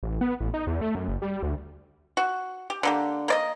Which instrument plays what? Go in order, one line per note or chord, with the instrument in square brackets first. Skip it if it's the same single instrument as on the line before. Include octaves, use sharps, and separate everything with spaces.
[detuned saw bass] A1
B3
A1
D#4
E2
A3
F#2
F#1
G3
D2
[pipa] F#4
G4
D3 A#3 G4
A#3 D5 D#5